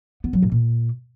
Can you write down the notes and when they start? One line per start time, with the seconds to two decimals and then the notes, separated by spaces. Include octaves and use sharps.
0.24 B3
0.33 F#3
0.42 A2
0.52 A#2